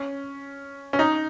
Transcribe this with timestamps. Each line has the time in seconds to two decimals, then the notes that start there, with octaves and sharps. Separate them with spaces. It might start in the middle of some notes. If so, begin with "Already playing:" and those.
Already playing: C#4
0.93 C#4
0.99 D#4